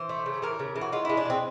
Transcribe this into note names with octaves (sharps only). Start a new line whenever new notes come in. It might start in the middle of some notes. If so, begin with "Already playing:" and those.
Already playing: E3 C5
A3
C#3
E3 A#4
C#3
E3
F#4
G#3 F4
G#3 E4
D4
B2 C4